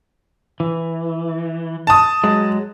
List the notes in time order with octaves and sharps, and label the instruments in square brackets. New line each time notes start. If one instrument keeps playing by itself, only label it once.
[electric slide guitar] E3
[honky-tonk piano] A5 D#6
[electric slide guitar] F#3 G#3